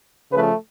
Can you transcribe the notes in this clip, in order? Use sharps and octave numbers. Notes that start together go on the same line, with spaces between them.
C#3 F3 A3 B4